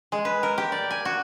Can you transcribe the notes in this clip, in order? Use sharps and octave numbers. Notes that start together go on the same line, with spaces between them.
G#3
B4
A#4
G4
D5
G#5
F#4